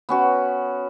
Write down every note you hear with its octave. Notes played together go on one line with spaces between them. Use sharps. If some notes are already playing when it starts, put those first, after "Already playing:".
B3 C#4 F#4